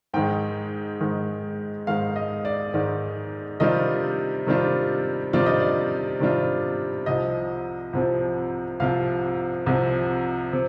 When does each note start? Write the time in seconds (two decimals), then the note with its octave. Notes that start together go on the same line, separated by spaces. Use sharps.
0.13 G#2 D#3 G#3 G5
1.01 G#2 D#3 G#3
1.87 G#2 D#3 G#3 F5
2.16 D#5
2.45 D5
2.74 G#2 D#3 G#3 D5
3.60 C3 D#3 G3 D4 F4 D#5
4.47 C3 D#3 G3 D4 F4
5.33 C3 D#3 G3 D4 F4 D5
5.46 D#5
5.60 D5
6.20 C3 D#3 G3 D4 F4
7.06 C2 C3 F3 D#5
7.93 C2 C3 F3
8.80 C2 C3 F3 F5
9.66 C2 C3 F3
10.53 C3